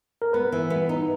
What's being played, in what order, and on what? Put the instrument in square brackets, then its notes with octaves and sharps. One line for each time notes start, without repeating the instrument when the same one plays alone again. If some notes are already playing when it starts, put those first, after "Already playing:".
[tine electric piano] A#4
[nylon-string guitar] B3 [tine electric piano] B4
[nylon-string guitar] E3
B3
D#4